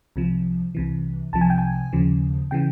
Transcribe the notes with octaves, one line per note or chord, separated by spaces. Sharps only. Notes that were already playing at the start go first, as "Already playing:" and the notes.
C2 C3 F3
C2 C3 E3
C2 C3 F3 A5
G#5
G5
G#5
D#2 C#3 F3
C#3 E3 G5